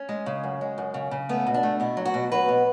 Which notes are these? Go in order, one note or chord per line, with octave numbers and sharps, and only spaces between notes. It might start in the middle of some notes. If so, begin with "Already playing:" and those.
Already playing: C#4
G#3
C#3
F#2
G#3
F#2
C#3
C#3
A3 B3
B2
D4
A3
B2 E4
F#3
F#4
B2
F#3 B4
B2